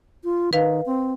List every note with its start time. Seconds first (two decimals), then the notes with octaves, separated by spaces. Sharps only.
0.24 F4
0.53 D#3 B4 F5
0.86 C4